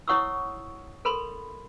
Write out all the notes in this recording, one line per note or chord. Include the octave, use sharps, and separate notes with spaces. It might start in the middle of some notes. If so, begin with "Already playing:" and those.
E4 C#5 F#5 C#6 D#6 E6
A4 A#4 B5 C6